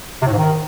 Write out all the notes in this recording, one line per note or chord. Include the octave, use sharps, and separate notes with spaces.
C3
A2
G#2
D#3